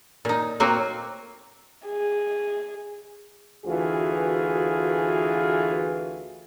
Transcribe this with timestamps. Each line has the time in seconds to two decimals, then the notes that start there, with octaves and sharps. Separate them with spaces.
0.25 A#2 D#4
0.60 F#3 A#3 C4 F#4
1.87 G#4
3.66 D2 E3 F4 F#4 G#4